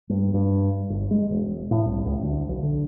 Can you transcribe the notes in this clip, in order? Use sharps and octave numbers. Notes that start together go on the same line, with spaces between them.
G2
G2
G1
G#3
E1
A2
C2
C#2
D2
B1
D3